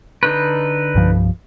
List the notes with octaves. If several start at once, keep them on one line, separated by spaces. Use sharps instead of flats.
D3 D#4 B4
C2 G2 F3